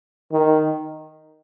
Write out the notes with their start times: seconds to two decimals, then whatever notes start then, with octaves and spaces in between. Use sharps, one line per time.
0.32 D#3